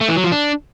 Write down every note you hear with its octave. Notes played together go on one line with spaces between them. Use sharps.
A3
E3
F#3
F3
D4